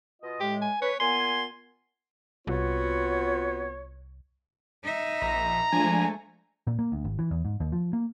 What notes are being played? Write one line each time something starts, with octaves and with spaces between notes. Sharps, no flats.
B2 F4 D#5
A2 G#3 G4
G#5
B4 C#5
A#2 B3 G#5 C6
C2 B3 C4 F4 F#4 C#5
D#4 E5
A#1 A#5
F3 G#3 A3 D4 G#5
A#2
A#3
D2
G#1
E3
E2
G#2
D#2
F3
A#3